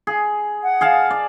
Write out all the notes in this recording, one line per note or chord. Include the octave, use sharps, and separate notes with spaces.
G#4
F#5
G#4 F5 A5
D5